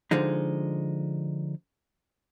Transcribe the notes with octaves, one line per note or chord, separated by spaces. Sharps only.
D3 F3 G#3 D#4